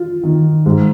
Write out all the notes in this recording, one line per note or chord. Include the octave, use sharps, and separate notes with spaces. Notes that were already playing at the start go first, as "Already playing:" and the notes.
Already playing: F4
D#3
G#2